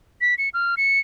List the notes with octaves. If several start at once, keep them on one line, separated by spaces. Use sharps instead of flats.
B6
C#7
F6
C#7